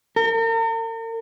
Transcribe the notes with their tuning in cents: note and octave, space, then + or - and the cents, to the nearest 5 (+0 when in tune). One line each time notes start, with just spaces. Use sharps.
A#4 -45